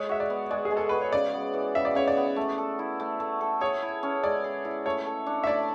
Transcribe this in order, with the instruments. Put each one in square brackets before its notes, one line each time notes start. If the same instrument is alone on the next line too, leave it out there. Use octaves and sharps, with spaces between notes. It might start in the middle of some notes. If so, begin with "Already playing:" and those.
Already playing: [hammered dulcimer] G#3 [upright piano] C#5
[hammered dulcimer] F#4 [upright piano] E5
[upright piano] D5
[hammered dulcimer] B3
[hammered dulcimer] G#3 [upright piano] D5
[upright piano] G#4
[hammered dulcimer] G#3
[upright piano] A4
[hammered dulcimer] F#4 [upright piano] B4
[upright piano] C#5
[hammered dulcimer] C#3 [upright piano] D5
[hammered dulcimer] B3
E3
[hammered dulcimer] C#3 [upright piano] E5
[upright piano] D5
[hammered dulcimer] C#3 [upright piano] C#5
[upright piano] D5
[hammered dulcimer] B3
A3
A4
E4
A3
A3
A4
[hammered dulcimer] G#4 [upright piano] C#5
[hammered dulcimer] E4
C#4
[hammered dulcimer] G#3 [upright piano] D5
[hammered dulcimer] G#4
E4
[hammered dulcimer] A3 [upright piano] C#5
[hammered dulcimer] A4
D4
[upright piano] E5
[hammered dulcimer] A3 [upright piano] D5